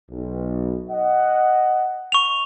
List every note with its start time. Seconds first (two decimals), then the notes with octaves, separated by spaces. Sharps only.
0.10 B1
0.90 D#5 F#5
2.12 C#6 F7